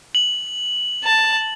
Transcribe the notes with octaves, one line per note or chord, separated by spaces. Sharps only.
F#7
A5